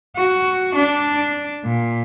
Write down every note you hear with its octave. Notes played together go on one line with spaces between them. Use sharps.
F#4
D4
A#2